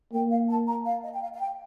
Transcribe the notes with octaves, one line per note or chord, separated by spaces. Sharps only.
A#3 G5
F5
A5
A#5
F5
D#5
G5
F5
F5
G5